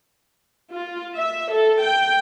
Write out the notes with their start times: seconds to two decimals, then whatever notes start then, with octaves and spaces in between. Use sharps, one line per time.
0.71 F4
1.16 E5
1.52 A4
1.80 G5